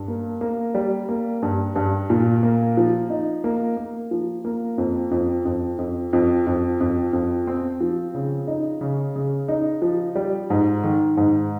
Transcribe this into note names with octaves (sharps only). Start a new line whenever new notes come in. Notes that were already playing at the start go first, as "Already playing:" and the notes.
Already playing: G2
A#3
A#3
G3
A#3
G2
G2
A#2
A#3
F3
D#4
A#3
A#3
F3
A#3
F2
F2
F2
F2
F2
F2
F2
F2
C4
F3
C#3
D#4
C#3
C#3
D#4
F3
G3
G#2
D#3
G#2